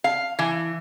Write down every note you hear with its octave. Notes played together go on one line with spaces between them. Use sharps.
F5
E3